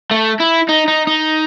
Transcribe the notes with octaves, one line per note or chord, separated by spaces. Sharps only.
A3
E4
D#4
D#4
D#4